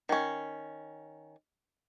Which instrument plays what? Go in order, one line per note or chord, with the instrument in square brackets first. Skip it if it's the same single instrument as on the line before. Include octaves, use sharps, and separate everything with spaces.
[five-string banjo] D#3 C#4